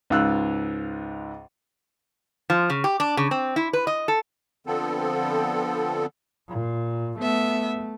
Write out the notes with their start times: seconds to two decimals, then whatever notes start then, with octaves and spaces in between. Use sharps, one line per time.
0.10 C#2 G#2 F5 E6 F#6
2.50 F3
2.70 C#3
2.84 G4
3.00 D4
3.17 C#3
3.31 C4
3.56 E4
3.73 B4
3.87 D#5
4.08 A4
4.67 D3 F3 B3 C4 A4
6.48 A#2
7.19 A3 B3 E5